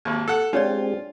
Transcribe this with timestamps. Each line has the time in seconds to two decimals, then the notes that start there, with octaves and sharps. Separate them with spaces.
0.05 G#1 D#2
0.28 A4 F#5
0.53 G#3 C4 D4 F4 G4 C#5 D5